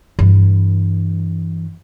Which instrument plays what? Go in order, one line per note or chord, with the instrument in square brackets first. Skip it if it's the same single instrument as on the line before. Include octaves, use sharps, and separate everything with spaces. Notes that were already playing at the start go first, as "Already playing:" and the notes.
[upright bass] G2 E3